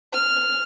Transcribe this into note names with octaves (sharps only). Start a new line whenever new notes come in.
F6